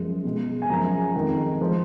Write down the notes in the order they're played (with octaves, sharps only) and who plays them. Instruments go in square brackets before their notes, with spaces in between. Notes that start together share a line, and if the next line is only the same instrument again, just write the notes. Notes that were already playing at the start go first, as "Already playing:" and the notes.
Already playing: [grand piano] F#2 F3 G#3
B2 G#3
G#5
F#2 F3 G#3 A#5
F2 D#3 G#3
F3 G#3